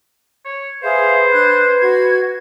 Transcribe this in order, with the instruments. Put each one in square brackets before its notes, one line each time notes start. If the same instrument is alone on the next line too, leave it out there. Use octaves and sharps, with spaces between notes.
[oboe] C#5
[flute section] G#4 E5 F5 [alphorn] B4 [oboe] C5
[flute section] D4 F#6 G#6
F#4 G#6